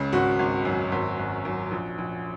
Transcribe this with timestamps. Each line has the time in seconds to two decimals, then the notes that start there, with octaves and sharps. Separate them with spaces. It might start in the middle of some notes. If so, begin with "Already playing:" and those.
Already playing: C#2 C#3
0.13 G#1 F#4
0.39 G#1
0.65 F#2
0.92 G#1
1.19 G#1
1.45 F#2
1.71 A#1
1.98 A#1